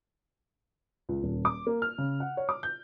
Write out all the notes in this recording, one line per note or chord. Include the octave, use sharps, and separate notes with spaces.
C#2
D#1
D6
A#3
F6
C#3
F#5
C#5
D6
G6